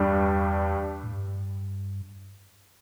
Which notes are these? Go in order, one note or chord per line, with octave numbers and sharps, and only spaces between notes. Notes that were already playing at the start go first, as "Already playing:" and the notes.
Already playing: E2 G2 G3 D4
A2
G2